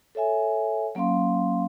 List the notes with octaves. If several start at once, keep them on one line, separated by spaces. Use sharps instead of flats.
A4 C#5 E5 G#5
F#3 A#3 C#4 F5 C6